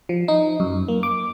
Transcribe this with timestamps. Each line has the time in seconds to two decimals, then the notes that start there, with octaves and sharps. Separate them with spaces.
0.09 F3
0.28 D#4
0.60 F#2
0.88 A#3
1.03 D6